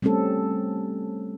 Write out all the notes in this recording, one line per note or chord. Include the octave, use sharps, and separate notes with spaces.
G3 A3 C4 C#4 A4